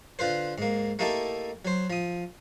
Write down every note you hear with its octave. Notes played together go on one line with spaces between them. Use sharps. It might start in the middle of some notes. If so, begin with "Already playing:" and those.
D3 F4 B4 C5
G#2 A#3
A3 A#3 D#4 E4 G4 A4
F#3 C5
F3 D#6